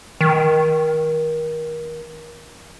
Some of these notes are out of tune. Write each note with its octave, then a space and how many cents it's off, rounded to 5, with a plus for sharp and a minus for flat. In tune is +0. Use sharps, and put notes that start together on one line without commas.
D#3 +25